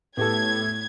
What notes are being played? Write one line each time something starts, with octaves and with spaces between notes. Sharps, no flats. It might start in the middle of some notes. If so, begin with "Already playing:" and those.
A2 B3 G4 A4 G#6